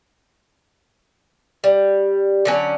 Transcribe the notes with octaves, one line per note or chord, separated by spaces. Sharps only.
G3
D3 F#3 C#4